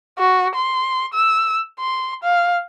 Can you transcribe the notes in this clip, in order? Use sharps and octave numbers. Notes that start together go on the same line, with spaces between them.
F#4
C6
E6
C6
F5